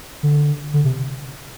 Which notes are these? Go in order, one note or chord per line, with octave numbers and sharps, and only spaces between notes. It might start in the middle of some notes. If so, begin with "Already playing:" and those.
D3
D3
C3